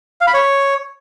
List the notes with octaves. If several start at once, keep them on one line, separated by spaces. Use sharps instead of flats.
F5
B5
C#5